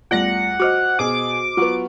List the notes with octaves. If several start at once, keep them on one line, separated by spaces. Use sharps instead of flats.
E2 G3 A3 F4 D5 F#5 A#6
F#4 C5 D#5 D6 F6
B2 G#4 D6
F#3 B3 F4 F#5 C#6